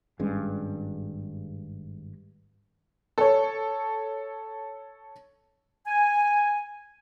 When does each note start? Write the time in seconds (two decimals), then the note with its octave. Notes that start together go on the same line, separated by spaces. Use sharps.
0.19 G#1 G2 G#3 C#4
3.18 A4 C#5
5.87 G#5